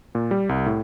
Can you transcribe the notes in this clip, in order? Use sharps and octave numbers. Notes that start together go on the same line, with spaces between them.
A#2
G3
C2
A2